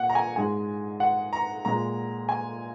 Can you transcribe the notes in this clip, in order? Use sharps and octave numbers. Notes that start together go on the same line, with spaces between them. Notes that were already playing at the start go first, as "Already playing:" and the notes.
Already playing: A#2 F#5
A#5
G#5
G#2 G#3 G#5
F#5
A#5
A#2 G#3 A#5
G#5